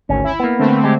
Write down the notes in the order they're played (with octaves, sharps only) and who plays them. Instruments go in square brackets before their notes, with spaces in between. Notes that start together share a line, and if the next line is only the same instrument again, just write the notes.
[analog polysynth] G#1 D2 [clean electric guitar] C#4
[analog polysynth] E4
[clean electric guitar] A#3 B3
[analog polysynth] D3 A3 C4
[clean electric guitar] G#3 G4